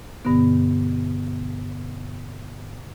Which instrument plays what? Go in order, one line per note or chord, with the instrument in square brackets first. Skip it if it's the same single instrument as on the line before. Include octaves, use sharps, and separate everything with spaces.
[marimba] G2 B2 D3 B3